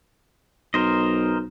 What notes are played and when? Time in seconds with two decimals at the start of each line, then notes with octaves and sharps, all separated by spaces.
0.74 B1 A#4 C5 D#5